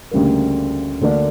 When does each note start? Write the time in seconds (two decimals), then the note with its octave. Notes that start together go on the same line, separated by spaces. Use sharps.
0.11 D2 C#3 G3 A#3
1.01 D2 D3 A#3 D4 A#4